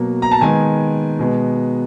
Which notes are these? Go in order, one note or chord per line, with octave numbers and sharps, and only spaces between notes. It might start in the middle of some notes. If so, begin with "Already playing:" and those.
Already playing: B2 F#3 A#3
A#5
A5
D#3 G#3 B3 G#5
B2 G#3 B3